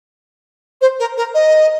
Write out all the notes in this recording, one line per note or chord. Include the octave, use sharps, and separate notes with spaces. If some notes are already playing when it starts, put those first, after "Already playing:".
C5
A#4
A#4
D#5